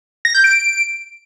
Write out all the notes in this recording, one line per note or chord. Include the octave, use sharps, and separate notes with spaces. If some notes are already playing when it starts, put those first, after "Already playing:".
A#6
G6
D7